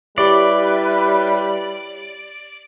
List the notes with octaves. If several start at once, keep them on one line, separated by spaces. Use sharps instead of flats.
G3 E4 G4 B4 C#5 D5